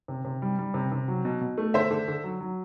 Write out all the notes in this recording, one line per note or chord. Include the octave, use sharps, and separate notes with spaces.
C3
C3
G3
G3
C3
C3
F#3
B2
B2
A3
D3 C5 E5
D3
D3
F#3
F#3